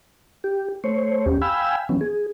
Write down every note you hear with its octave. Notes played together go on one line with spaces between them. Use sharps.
G4
A3 C5 C#5
D#2 C#4 G4
F5 G5 G#5 B5 E6
E3 F#3 B3 C#4
G#4